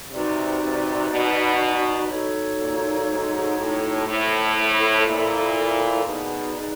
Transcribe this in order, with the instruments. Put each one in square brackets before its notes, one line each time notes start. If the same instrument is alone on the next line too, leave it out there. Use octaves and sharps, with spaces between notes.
[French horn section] C3 [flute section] D#4 F#4 B4 D5
[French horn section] C3
B2
[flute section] D#4 F#4 A4 C#5
[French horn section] A#2
G#2
A2
[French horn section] A2 [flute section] E4 A4 C5 E5
[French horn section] A#2
[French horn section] B2 [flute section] D#4 G#4 B4 D5